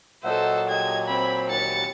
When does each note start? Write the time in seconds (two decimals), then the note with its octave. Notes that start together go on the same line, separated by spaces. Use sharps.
0.24 A#2 F#3 A4 C5 D#5 E5 F#5
0.69 G#3 G4 D#5 G#6
1.08 C4 B5
1.50 D#2 A6 C#7